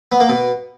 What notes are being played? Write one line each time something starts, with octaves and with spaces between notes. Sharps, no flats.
B3
A#3
B2